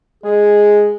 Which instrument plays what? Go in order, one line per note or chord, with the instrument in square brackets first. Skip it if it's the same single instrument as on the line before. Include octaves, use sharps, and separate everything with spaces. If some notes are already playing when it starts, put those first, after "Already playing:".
[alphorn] G#3 [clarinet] G#4